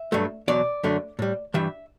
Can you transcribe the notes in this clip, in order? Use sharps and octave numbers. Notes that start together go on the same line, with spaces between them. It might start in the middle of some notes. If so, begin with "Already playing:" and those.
Already playing: E5
G2 F#3 A3
E2 B2 F#3 D5
F#2 D3 A3
A2 G3
G2 E3 G3 E5